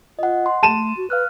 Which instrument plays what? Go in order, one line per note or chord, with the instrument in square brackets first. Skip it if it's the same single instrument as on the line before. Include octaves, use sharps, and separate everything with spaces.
[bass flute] F4 [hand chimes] D#5 F#5
[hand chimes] C6
[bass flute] A3 [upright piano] A5 D#7 E7
[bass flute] F#4
[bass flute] B4 [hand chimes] F5 F6 F#6